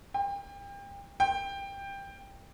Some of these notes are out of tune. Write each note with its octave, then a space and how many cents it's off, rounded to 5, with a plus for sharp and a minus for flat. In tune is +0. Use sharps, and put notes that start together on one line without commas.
G5 +35
G5 +15